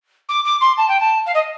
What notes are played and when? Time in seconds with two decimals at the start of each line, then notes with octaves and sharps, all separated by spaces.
0.29 D6
0.45 D6
0.61 C6
0.78 A5
0.89 G5
1.00 A5
1.26 F5
1.35 D#5